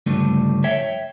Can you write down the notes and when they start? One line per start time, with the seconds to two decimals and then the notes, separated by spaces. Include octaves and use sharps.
0.06 C#2 G2 D3 F3 G3 A3
0.64 C#5 E5 G5